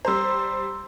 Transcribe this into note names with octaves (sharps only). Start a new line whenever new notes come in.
G3 C5 A#5 C6 E6